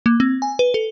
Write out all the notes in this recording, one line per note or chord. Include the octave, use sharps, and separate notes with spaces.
A#3
C4
G#5
B4
A4